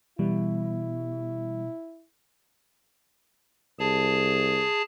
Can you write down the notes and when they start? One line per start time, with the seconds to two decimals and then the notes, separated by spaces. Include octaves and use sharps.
0.19 B2 E3 G3 E4
3.79 C2 G#4 A5